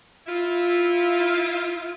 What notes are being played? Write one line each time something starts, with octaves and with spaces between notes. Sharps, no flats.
E4 F4